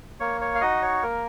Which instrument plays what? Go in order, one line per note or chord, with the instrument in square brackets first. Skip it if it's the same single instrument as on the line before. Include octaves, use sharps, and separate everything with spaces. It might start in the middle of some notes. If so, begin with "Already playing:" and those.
[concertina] A#3 C#5
C#5
F5
D#4 F#4 D#5
C#5
A#3 A#4